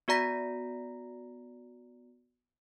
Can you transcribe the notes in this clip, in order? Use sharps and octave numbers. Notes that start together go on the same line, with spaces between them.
B3 F#4 D5 A#5 A#6 B6